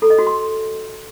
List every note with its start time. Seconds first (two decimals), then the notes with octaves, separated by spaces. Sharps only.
0.02 A4
0.10 D#5
0.18 F#4
0.27 C6